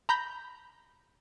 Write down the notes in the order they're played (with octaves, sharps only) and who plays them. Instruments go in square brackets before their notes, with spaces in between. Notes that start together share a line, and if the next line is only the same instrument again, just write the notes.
[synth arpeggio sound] A#5 B5 G6